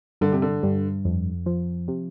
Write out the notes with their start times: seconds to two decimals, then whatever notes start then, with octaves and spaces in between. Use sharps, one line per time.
0.21 G2 D3
0.32 C3
0.42 D3
0.63 G2
1.05 F2
1.46 F3
1.88 C3